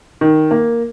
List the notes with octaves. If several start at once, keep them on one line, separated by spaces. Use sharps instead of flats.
D#3
A#3